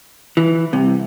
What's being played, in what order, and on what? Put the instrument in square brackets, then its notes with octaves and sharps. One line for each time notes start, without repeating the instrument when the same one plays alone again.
[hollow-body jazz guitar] E3
C2 C3